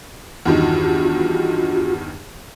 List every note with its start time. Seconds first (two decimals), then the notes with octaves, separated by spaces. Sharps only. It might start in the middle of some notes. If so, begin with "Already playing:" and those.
0.45 E2 G2 D#3 F4 F#4